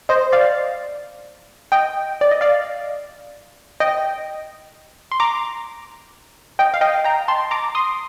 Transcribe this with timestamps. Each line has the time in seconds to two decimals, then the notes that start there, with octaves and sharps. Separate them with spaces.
0.09 C5 D#5
0.32 D5 F5
1.72 D#5 G5
2.21 D5
2.31 D#5
2.41 D5 F5
3.80 D#5 G5
5.12 C6
5.20 A#5 D6
6.59 D#5 G5
6.74 F5
6.81 D#5 G5
7.04 G5 A#5
7.28 A5 C6
7.51 A#5 D6
7.75 C6 D#6